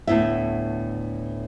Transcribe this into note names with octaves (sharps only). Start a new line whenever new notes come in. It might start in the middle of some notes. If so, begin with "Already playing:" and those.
D2 A2 B3 E4 E5